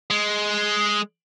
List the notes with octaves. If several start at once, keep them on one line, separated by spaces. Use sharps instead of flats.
G#3